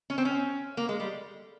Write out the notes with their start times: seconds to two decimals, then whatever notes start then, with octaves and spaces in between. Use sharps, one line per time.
0.10 C#4
0.18 C4
0.25 C#4
0.77 A#3
0.89 G#3
1.00 G3